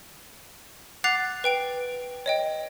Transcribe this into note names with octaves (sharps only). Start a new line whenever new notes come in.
F#5 D6 F#6 A6 C7 F7
B4 G5 D7
C#5 D#5 G5